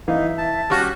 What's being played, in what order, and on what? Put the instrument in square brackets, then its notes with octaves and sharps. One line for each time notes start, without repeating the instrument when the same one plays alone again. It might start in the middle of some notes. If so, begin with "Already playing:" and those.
[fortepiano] E3 F5 [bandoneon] D#4 [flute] E5
[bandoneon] A5
[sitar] G3 C#4 F#4 [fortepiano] G4 [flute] F6